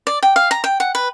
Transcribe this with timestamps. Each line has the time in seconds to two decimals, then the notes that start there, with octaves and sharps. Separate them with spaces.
0.07 D5
0.23 G5
0.36 F5
0.51 A#5
0.64 G5
0.80 F#5
0.95 B4